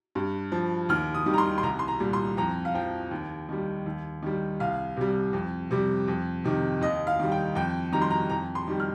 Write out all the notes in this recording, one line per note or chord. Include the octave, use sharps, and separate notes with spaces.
G2
F3
D#2 F6
D#6
D#3 G3
A#5
C6
C6
C2 A#5
C6
A#5
A#2 G3
C6
F2 A#5
F5
F3 G5
D#2
D#3 G3
D#2
D#3 G3
C2 F5
C3 G3
F2
C3 G3
F2
C3 D#3
D#2 D#5
F5
D#3 G3
G5
F2 G5
D#3 G3 A#5
C6
A#5
F2 A#5
C6
D#3 G3
F6